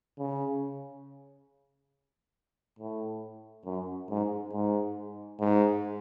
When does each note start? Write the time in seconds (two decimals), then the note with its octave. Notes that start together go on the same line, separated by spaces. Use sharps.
0.19 C#3
2.79 A2
3.65 F#2
4.09 G#2
4.52 G#2
5.39 G#2